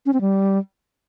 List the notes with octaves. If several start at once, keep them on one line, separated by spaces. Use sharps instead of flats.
C#4
C4
G3